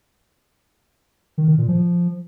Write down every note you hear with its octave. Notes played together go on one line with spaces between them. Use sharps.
D#3
D#3
A#2
F3